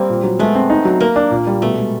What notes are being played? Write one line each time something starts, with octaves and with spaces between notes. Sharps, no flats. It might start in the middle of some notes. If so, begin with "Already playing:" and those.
Already playing: G3 A#3 C4
A#2
F#3
G#3 A3 B3
C4
D#4
F#3
A#3 A#4
D4
A#2
G3
B2 A3
G#3